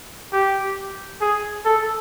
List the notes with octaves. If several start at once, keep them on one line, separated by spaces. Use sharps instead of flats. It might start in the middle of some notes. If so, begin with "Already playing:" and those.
G4
G#4
A4